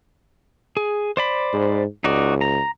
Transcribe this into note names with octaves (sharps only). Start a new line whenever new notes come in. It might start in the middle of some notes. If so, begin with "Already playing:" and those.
G#4
C5 D5 B5
G#2
C#2 D#4 F#4 D5
A#5